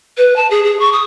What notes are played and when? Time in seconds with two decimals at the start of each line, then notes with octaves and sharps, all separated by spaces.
0.17 B4
0.36 A5
0.50 G#4
0.64 G#4
0.79 C#6
0.92 D#6